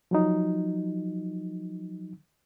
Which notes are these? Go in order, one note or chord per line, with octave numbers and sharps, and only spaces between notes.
F3 F#3 D#4